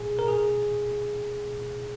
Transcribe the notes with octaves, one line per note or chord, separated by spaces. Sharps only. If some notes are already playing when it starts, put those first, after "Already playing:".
Already playing: G#4
A#4
G#4